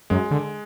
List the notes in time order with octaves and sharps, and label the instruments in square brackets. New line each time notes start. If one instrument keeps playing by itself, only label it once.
[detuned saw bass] F#2 [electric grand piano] G#3
[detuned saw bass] D3